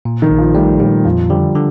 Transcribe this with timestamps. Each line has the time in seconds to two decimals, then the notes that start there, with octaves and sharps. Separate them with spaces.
0.05 A#2
0.22 D#3
0.30 A#1
0.38 F3
0.54 G3 A3
0.80 A#2 G3
1.05 F2 F3
1.30 D3 G3
1.55 D3